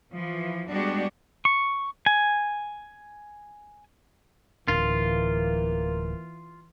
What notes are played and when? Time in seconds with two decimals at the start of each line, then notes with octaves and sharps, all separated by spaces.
0.11 E3 F3
0.69 G3 G#3 B3 D4 F#4 G4
1.45 C#6
2.06 G#5
4.68 D1 E3 A#3 D4 F4